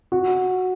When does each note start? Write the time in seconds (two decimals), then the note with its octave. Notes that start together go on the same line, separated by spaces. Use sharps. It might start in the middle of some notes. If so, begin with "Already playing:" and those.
0.12 F#4